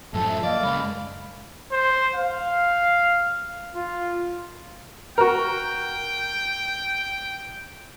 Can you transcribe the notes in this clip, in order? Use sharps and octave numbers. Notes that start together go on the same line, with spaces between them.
F#2 A2 F3 A4 A5
E5
A#3 D5 D#5
C#3 G#3 B5
C5
F5
F4
F#4 A#4 G5